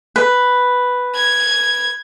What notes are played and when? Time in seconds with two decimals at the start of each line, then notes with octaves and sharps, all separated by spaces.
0.16 B4
1.15 G#6